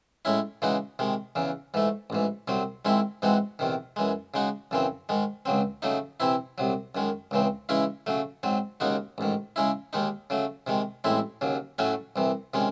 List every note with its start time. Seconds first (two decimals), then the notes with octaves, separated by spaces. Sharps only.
0.25 A2 G#3 C#4 E4
0.62 C#3 E3 G#3 D#4 F#4
0.99 C3 D#3 G#3
1.35 E2 C#3 E3
1.74 G#2 E3 A3
2.10 A1 G#2 E3
2.48 C2 C3 F#3 C4
2.85 G#2 D#3 G#3 C4 E4
3.22 G#2 E3 G#3 C4 F#4
3.59 E2 C3 D#3
3.96 F#2 E3 G#3
4.34 C#3 G#3 D#4 F#4
4.71 F#2 C#3 E3 C4
5.09 G#2 D#3 G#3
5.45 C#2 C#3 F#3 C4
5.82 C#3 F#3 A3 D#4
6.20 C3 E3 C4 E4
6.58 C2 C3 F#3
6.95 F#2 D#3 G#3
7.31 C#2 C#3 E3 C4
7.69 C#3 E3 G#3 C#4 E4
8.06 C#3 F#3 A3
8.43 G#2 F#3 C4
8.80 D#2 C#3 G#3 D#4 F#4
9.18 A1 G#2 D#3
9.56 C#3 G#3 C#4 E4
9.93 D#2 D#3 G#3 D#4
10.30 C#3 F#3 A3
10.67 C3 D#3 G#3
11.04 A1 A2 G#3 C4 E4
11.41 D#2 C#3 F#3
11.78 A2 F#3 A3 C#4 F#4
12.16 C2 C3 E3
12.54 C3 D#3 G#3 C#4